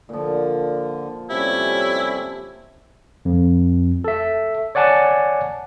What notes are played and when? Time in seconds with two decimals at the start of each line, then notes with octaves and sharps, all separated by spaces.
0.09 A#2 D3 F3
1.30 C3 G3 A3 C#4 E4
3.25 F2
4.04 A4 E5
4.75 C#5 D5 F#5 G#5 A5